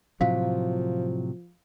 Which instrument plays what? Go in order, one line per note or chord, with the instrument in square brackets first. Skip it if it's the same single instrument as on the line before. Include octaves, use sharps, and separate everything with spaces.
[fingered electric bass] A2 C3 F#3 [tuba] F3 [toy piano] F5